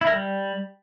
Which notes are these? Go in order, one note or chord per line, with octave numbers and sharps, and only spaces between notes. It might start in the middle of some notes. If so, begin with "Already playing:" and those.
E4
A#4
G3